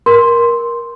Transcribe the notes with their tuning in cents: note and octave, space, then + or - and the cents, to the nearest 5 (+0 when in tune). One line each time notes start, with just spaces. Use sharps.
A#4 +15 C6 +0